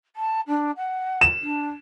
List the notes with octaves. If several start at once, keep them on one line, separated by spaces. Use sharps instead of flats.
A5
D4
F#5
E7
D4